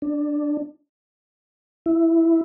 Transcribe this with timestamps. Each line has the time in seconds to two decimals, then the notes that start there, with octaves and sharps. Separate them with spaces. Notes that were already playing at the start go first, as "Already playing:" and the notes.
0.02 D4
1.86 E4